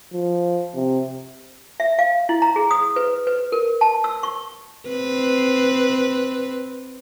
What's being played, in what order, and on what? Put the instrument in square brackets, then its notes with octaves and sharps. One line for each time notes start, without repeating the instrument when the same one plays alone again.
[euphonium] F3
C3
[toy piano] E5
F5
E4
A#5
G#4
D#6
B4
B4
A#4
A5
E6
C#6
[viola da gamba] C4 B4